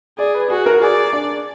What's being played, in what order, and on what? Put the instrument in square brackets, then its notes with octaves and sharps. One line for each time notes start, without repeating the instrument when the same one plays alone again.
[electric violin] G#4 [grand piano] D5
[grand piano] B4
[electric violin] F#4 [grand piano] G#4
[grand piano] A#4
[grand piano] G#4 [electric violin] D5
[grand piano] D4